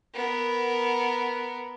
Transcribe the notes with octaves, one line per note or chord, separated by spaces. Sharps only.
B3 A#4